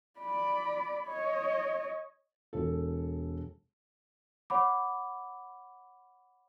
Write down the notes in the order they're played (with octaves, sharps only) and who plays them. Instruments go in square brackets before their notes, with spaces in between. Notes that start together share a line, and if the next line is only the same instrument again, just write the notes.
[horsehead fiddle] D5 B5
C#5 D#5
[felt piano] E1 A4
[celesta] C#5 F#5 B5 D6